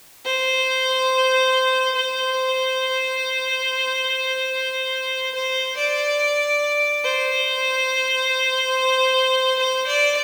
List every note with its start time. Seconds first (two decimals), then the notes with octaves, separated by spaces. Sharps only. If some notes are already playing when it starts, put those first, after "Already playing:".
0.25 C5
1.94 C5
5.34 C5
5.76 D5
7.04 C5
9.59 C5
9.86 D5